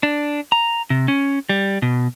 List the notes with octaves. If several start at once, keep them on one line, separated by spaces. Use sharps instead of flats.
D4
A#5
C3
C#4
G3
B2